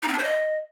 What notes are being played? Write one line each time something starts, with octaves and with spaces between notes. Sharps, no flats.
D#4
C4
D4
C5
D#5